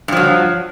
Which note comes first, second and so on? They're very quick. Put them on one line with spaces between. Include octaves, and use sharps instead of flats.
G2 F3 F#3